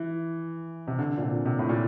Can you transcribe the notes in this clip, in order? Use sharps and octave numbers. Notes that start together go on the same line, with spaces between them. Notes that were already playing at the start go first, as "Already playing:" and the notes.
Already playing: E3
C3
D3
A#2
C3
C3
A2
A#2